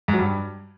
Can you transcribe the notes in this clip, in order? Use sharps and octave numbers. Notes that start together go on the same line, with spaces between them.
G#2
F#3
G2